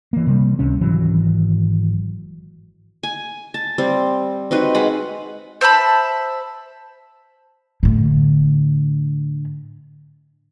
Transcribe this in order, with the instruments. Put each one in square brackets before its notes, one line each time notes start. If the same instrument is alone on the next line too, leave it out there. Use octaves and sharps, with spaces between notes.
[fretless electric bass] E3 A#3
C3 G3
C#2 C3 C#4
G#1 E3 F#3
[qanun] G#5
A5
G3 C4
C4 D#4 F#4 B4
G#3 F5 F#5 B5
[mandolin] C5 E5 A5 B5
[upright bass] A2 D3